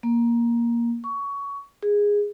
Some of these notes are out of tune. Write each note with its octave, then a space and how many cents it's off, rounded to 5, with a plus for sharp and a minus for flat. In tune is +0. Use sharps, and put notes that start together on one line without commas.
A#3 +10
C#6 +20
G#4 -10